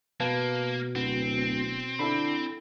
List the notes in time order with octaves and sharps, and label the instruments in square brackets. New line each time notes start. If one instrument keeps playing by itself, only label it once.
[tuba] B2 [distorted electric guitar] A#3 [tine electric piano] B4 F5 A5
[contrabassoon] D1 [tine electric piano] B3 [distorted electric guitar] C4
[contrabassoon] D3 [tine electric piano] E4 A4 B5